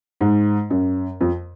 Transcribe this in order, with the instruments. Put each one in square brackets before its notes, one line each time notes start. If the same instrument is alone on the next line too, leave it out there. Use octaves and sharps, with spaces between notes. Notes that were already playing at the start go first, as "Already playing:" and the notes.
[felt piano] G#2
F#2
F2